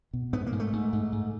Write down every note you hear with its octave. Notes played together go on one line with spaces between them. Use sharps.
B2
G#2 B3
A#3
G#2
A3
G#2
G#2
G#2